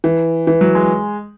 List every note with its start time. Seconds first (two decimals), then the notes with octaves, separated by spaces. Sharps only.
0.04 E3
0.47 E3
0.61 F#3
0.75 G#3